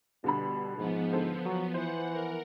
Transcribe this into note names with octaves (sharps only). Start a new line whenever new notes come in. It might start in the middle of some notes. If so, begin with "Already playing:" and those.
B2 D3 G3 B5
G#2 F3 B3
D3 A4 C5
F#3
E3 C5 F#5
A#4